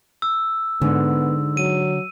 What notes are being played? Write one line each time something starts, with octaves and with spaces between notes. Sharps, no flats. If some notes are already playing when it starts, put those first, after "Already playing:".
E6
G#2 D3 B3
F#3 D#7